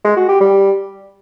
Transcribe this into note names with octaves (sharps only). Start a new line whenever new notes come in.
G#3
F#4
G4
G3